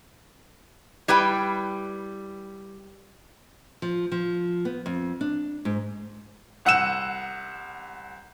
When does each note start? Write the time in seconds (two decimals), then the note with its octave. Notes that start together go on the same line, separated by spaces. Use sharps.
1.08 G3 E4 B4 G5
3.82 F3
4.12 F3
4.65 B3
4.86 F2
5.21 D4
5.65 G#2
6.65 C2 F#5 E6 E7